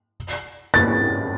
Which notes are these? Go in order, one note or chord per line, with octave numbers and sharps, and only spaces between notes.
A6